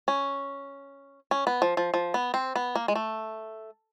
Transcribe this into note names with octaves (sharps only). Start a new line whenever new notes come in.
C#4
C#4
B3
F3
F3
F3
B3
C4
B3
A#3
G#3
A3